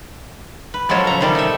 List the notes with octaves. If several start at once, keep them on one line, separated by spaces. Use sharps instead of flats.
B4
F3 F#3 G#3 C#4 A4 C#5
C#3 A#5
C3 D#3 G3 A4
D#4 E5